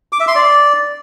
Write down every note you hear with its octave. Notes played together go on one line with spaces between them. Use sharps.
D6
E5
C6
D5